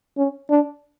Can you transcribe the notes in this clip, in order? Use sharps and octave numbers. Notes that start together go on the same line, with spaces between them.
C#4
D4